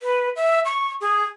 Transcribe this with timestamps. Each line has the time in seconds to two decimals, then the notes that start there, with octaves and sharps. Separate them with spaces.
0.01 B4
0.36 E5
0.65 C#6
1.01 G#4